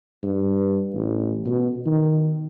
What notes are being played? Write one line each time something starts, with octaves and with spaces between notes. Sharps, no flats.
G2
A1
B2
D#3